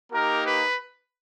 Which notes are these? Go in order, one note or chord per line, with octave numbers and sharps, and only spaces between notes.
A#3 D#4 G4 A#4
B4